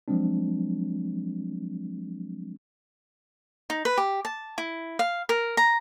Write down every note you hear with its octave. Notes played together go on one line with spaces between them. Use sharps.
F3 F#3 G#3 C4 D4
D#4
B4
G4
A5
E4
F5
A#4
A#5